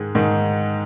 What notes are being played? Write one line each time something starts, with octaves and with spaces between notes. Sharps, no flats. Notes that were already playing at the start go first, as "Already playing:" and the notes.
Already playing: G#2 D#3 G#3
G#2 D#3